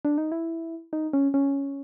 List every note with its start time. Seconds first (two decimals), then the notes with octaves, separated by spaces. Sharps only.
0.05 D4
0.18 D#4
0.32 E4
0.93 D#4
1.13 C#4
1.34 C#4